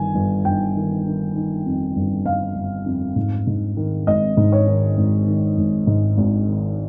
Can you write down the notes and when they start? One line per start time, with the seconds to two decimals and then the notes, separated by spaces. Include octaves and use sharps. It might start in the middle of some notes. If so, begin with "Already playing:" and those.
Already playing: G1 D#3 G#5
0.15 G1
0.45 G1 G5
0.75 D#3
1.06 D#3
1.36 D#3
1.66 F2
1.96 G1
2.26 G1 F5
2.56 G1
2.86 F2
3.16 G#2
3.47 G#2
3.77 D#3
4.07 G#1 D#5
4.37 G#2
4.52 C#5
4.67 D#3
4.97 G#1
5.27 D#3
5.57 G#1
5.87 G#2
6.17 G#1
6.47 D#3